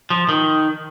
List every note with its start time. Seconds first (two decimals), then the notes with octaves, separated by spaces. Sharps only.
0.10 F3
0.29 D#3